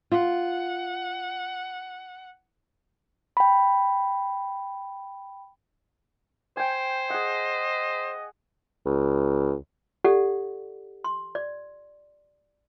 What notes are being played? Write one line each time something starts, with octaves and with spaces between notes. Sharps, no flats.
F4 F#5
G5 B5
C5 G5 G#5
G#4 D#5 F#5
C#2
G4 A4 D5 F#5
C6
D5